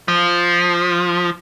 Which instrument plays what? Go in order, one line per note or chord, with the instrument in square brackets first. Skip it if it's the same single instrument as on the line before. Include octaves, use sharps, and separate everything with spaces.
[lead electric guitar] F3